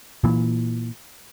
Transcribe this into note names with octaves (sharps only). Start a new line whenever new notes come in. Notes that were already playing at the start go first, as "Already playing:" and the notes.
A#2 E3